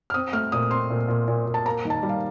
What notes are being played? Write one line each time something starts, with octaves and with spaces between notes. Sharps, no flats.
F6
C4 D#6
A3 F6
A#2 D#6
C4 C6
A#2
A#2
A#2
A#2
A5
A#3 A#5
D#3
A5
G3
F5